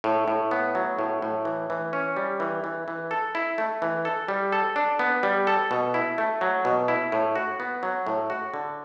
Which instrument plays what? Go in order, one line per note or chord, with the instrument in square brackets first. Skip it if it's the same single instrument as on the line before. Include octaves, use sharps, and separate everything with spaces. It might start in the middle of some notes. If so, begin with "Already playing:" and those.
[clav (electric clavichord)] A2
A2
B3
F#3
A2
A2
E3
E3
C#4
G3
E3
E3
E3
A4
E4
A3
E3
A4
G3
A4
D4
B3
G3
A4
B2
E4
A3
F#3
B2
E4
A2
F#4
B3
F#3
A2
F#4
D3